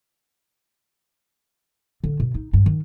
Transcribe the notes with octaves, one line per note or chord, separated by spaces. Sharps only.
D3
B2
D#4
G2
D#3